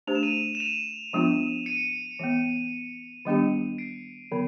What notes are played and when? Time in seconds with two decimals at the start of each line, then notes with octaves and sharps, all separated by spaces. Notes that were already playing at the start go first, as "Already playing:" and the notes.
0.07 A3 D4 G4 C5 F7
0.15 E7
0.23 D#7 F7
0.55 E7
0.60 D#7 F7
1.13 F3 G#3 B3 D4 F4
1.66 C#7 D#7
2.19 E3 G#3 B3
3.25 D#3 G3 B3 D4 G4
3.78 C7 D7
4.31 D3 F#3 B3